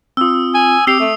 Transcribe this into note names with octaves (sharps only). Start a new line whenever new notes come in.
C4 F4 D#6 E6
G#5
C4 G4 D6 E6 C7 F7
A3